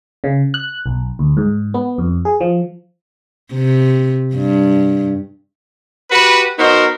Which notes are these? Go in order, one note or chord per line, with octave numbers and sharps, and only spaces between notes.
C#3
F#6
B1
D2
G#2
B3
F2
G#4
F3
C3
G2
F#4 G4 B4
B3 D#4 F#4 A#4 C5